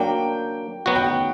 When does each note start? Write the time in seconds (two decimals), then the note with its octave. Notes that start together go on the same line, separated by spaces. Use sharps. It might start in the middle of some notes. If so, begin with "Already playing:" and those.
Already playing: F#3 A#3 D4 G5
0.86 F#3 B3 F#4 F#5
0.95 G5
1.04 F#5